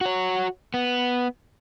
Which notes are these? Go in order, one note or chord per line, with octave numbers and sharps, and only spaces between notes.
F#4 C#5
B3